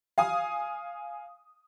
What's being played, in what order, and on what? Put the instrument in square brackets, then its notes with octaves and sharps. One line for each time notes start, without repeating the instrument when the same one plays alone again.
[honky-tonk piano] F5 G#5 D#6